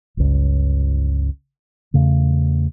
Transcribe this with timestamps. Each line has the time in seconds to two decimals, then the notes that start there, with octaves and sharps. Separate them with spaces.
0.17 G1 C#2
1.94 E2 C#3 A3